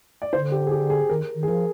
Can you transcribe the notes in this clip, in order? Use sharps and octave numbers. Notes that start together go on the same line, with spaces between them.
D5
D3 C5
G4
G#4
G4
G#4
D#3 A#4
D#3
G#4
F3 A#4